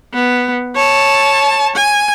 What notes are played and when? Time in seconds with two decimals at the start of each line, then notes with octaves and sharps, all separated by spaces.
0.14 B3
0.76 C#5 A5
1.75 G#5